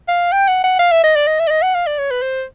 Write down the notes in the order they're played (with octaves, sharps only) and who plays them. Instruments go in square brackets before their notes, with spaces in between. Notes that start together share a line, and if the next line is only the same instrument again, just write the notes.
[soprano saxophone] F5
G5
F#5
F#5
F5
E5
D#5
D5
D#5
E5
D5
D#5
F#5
F5
D5
C#5
B4
C5